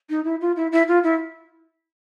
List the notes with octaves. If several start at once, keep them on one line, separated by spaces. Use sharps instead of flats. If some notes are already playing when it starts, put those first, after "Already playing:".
D#4
E4
F4
E4
E4
F4
E4